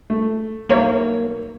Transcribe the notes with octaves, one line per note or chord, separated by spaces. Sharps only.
A3
B1 A#3 C#5 E5